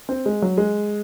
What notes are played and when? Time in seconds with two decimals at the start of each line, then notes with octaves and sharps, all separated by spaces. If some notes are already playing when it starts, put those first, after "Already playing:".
0.09 C4
0.26 G#3
0.42 F#3
0.58 G#3